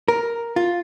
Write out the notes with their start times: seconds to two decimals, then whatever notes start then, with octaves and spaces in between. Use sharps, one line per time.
0.08 A#4
0.56 F4